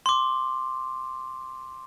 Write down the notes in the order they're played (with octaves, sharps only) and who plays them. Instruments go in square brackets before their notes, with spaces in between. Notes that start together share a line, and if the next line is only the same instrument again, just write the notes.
[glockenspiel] C6 D6